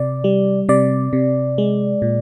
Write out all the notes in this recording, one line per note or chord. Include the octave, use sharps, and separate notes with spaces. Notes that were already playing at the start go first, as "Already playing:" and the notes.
Already playing: C3 D5
G3
C3 D5
C3
G#3
A#2